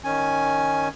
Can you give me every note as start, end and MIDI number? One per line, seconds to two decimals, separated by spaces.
0.04 0.88 51
0.04 0.88 61
0.04 0.88 80